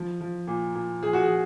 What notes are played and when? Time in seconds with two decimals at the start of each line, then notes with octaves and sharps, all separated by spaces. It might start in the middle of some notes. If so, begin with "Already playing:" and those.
Already playing: F3
0.21 F3
0.47 A#2
0.75 A#2
1.02 F3 G#4
1.13 F#4
1.23 G#4
1.29 F3